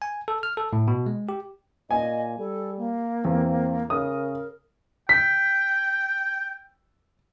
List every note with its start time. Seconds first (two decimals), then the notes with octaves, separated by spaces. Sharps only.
0.02 G#5
0.28 A4
0.43 F6
0.57 A4
0.73 A2
0.88 B2
1.06 G#3
1.29 G4
1.91 A#2 D#5 G#5
2.39 G3 A4
2.78 A#3
3.25 E2 C4
3.90 C#3 A#4 D#6
5.09 G5 B6